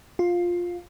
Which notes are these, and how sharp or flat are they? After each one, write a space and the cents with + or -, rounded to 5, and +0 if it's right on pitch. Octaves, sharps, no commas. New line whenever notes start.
F4 +10